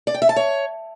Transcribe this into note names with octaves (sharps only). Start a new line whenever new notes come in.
D5
G5
E5
A5
C#5